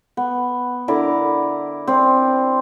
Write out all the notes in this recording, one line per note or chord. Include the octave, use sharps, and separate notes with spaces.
B3
D3 E4 A#4 D5
C4 D5